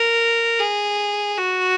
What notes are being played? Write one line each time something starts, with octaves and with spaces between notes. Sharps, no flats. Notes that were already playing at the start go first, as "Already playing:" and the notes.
Already playing: A#4
G#4
F#4